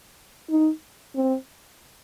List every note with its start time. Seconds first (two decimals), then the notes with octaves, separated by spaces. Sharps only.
0.50 D#4
1.15 C4